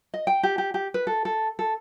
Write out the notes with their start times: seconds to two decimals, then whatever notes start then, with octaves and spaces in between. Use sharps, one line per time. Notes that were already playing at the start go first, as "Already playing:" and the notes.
0.14 D#5
0.27 G5
0.43 G4
0.58 G4
0.74 G4
0.94 B4
1.07 A4
1.25 A4
1.59 A4